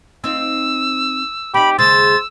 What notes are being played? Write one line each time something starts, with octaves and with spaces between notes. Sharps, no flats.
C4 D#4 F4 E6
C4 D#4 G4 B5
D#2 C#3 G#3 C5 E6 A6